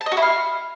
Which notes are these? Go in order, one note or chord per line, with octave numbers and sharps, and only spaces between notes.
A5
D#5
F#4
E4
F5